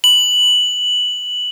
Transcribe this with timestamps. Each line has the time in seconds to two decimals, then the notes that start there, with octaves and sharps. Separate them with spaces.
0.04 F#7